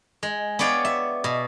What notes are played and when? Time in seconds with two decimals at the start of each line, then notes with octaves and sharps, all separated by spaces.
0.23 G#3
0.59 B3 C#5 D5 F5 G5
0.85 E5
1.24 B2